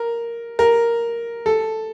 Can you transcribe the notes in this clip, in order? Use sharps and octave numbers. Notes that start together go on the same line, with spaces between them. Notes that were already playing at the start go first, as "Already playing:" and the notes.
Already playing: A#4
A#4
A4